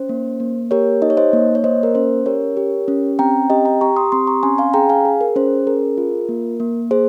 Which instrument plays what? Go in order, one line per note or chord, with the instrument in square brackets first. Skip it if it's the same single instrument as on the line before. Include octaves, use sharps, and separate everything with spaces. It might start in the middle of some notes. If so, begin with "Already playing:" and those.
Already playing: [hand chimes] C#4 C5
A#3
A#3
G4 A#4 C#5
D#4 D#5
C#5
C5 D#5
A#3
C#5
A#3 C5 D#5
A#4
C#4 C5
G4 A#4 C#5
G4
C#4
C4 G5 A#5
G4 D#5 G5
G5 A#5
G4 A#5 C#6
C6 D#6
C4 C6 D#6
A#5 C#6
C#4 G#5 C6
F5 G#5
G#4 G5 A#5
F5 G#5
G#4
A#4
C#4 C5
G#4 A#4
F4
A#3
A#3
G#4 C5